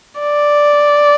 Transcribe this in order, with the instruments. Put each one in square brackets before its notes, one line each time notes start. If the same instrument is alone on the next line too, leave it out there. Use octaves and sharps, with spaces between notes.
[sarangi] D5